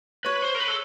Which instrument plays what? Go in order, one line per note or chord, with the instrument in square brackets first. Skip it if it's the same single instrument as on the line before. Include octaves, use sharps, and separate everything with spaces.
[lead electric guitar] B4 [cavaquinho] C#5
[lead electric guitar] C5
A#4
B4
A4